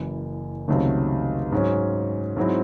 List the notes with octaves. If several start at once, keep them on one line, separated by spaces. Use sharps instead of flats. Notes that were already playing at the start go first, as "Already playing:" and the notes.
Already playing: F#1 F#2 E3
C#2 C3 D#3 F#3 A3
G#2 F#3 C#4
G#2 F#3 C4 E4